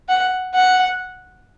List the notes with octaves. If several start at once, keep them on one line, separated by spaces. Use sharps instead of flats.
F#5
F#5